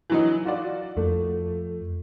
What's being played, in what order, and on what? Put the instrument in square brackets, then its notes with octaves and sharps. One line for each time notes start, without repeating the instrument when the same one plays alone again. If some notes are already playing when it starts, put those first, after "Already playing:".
[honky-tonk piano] E3 F#3 D#4
F4 F#4 D5
[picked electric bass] F2 [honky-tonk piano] A3